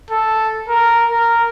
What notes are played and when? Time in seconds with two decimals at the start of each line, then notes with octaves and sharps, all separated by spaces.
0.10 A4
0.69 A#4
1.10 A#4